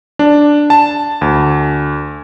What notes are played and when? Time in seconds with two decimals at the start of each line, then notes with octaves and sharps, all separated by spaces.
0.19 D4
0.70 A5
1.21 D2